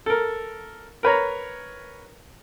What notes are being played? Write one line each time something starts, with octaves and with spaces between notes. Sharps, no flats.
A4 A#4
A#4 B4 C#5 A#5